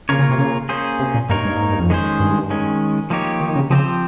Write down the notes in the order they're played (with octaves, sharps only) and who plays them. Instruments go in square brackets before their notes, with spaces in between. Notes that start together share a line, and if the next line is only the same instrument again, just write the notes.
[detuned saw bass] C#3 [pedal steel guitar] A#3 F4 A#4 C#5
[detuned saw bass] C#3
C3
C#3
[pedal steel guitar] A#3 C#4 G#4 C5
[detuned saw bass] C3
A#2
[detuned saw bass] G2 [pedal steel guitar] A#3 D#4 A#4 C#5
[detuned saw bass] G2
G2
G#2
G2
F2
[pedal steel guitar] D#3 G#3 C#4 G#4 C5
[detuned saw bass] G2
[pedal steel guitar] D#3 G#3 C#4
F3 A#3 D#4 G4 C#5
[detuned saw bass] D#3
C#3
[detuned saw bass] C#3 [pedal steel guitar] F3 C4 G4 C5